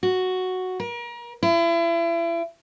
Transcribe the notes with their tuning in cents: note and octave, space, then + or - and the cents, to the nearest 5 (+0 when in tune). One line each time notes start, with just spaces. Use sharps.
F#4 +0
A#4 +35
E4 +35